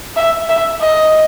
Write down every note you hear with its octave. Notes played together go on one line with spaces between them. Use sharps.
E5
E5
D#5